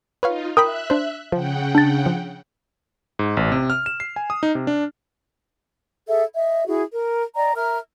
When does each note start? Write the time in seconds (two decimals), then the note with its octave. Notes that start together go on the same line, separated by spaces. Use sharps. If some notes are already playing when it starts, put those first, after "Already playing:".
0.23 D#4 F4 B4 C#5 F5
0.57 A#4 E5 G5 B5 D#6 F#6
0.90 D4 C5
1.32 C#3 F3 F#5 G5
1.75 D4 A6
2.06 F3
3.19 G#2
3.37 A1
3.52 C3
3.70 F6
3.86 E7
4.00 C7
4.16 G#5
4.30 D#6
4.43 D#4
4.55 C3
4.67 D4
6.08 G#4 A4 E5
6.34 D#5 E5
6.66 E4 F#4 G#4
6.93 A#4
7.35 D5 D#5 G5 A#5
7.56 A#4 E5 A#5 F6